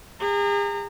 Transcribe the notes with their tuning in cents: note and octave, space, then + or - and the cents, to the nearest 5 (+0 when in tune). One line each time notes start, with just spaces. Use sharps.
G#4 -45 A#5 -30